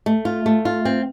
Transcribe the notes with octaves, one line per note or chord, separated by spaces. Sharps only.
A3
F4
A3
F4
C4